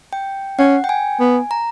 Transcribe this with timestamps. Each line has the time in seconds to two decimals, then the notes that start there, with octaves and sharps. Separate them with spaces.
0.13 G5
0.59 C#4 F#5
0.84 G5
0.89 G#5
1.20 B3
1.51 A#5